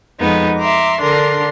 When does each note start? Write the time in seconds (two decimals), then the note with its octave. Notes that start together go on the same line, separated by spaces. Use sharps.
0.19 F2 G#3 B3 D#4
0.59 E5 A#5 C6 D6
1.01 D3 D4 A#4 C6